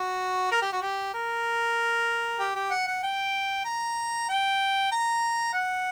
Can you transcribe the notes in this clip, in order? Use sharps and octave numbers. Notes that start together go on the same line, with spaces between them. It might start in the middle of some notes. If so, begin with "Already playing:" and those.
Already playing: F#4
A#4
G4
F#4
G4
A#4
G4
G4
F#5
F#5
G5
A#5
G5
A#5
F#5